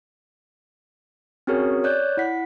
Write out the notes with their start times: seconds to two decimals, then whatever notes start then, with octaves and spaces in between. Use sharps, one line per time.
1.47 C4 C#4 F#4 G#4 A#4 C#5
1.84 C#5 D5 F#6 G6
2.17 E4 F#5 B6